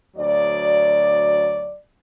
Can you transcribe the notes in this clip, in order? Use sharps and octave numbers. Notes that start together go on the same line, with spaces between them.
D2 F#3 D5